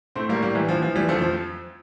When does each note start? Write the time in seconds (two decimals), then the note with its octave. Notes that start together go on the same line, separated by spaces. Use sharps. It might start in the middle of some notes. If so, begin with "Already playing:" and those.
0.15 A2 A3 C4
0.29 G3 A#3
0.36 A2
0.42 G3 A#3
0.55 E3 G3
0.69 F3
0.75 E3
0.82 F3
0.95 E3 G3
1.08 F3 A3
1.15 F2
1.22 F3